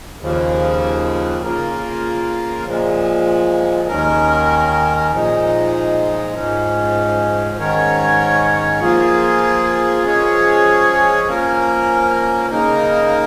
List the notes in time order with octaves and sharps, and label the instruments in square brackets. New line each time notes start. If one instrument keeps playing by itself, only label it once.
[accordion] D#2 C#3 F3
C#3 A#3 F4 A#4
A#2 F3 G#3
D#2 D#3 C#4 A#4
A#2 F3 G#3 D#4
G#2 F3 G#3 C#4
G#2 D#3 C#4 A#4 C#5
F3 A#3 F4 G#4
F3 G#3 C#4 G#4 C#5
F3 A#3 C#4 A#4
C#3 A#3 D#4 A#4